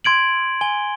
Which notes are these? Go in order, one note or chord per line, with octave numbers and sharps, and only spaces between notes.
C6 G#6 D7 F#7
G#5 G7